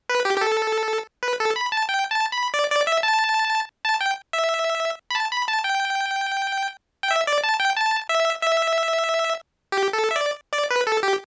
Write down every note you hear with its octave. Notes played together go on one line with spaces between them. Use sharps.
B4
G4
G4
A4
B4
A4
B5
A5
G5
A5
B5
D5
D5
E5
A5
A5
G5
E5
B5
A5
B5
A5
G5
G5
E5
D5
A5
G5
A5
E5
E5
G4
A4
E5
D5
D5
B4
A4
G4